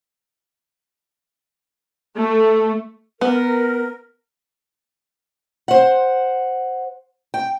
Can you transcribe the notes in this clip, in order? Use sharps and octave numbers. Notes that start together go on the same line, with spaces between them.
A3
B3 A#4
C5 F#5
G5